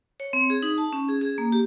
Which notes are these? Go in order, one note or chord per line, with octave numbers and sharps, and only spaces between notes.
C#5
C4
G#4
D#4
A5
C#4
G#4
G#4
A#3
G4